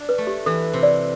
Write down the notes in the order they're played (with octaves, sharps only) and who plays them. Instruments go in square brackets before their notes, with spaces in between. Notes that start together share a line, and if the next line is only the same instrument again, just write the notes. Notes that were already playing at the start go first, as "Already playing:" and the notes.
Already playing: [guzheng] D4
[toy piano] B4
[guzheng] A3
[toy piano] G4
[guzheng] E3 [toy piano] A4
[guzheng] C3
[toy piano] D5